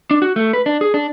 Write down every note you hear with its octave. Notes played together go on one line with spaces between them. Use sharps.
D4
F#4
A3
B4
D4
G#4
D4